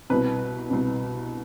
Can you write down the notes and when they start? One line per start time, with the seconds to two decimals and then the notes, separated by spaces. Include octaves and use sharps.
0.10 C2 B2 B4
0.70 C2 B2